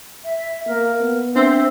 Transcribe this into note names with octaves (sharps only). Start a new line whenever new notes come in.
E5
A#3 A#4
B3
C4 D4 E5 E6